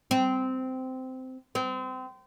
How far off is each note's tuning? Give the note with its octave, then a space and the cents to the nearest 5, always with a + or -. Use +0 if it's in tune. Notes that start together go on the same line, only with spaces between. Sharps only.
C4 -15
C4 -30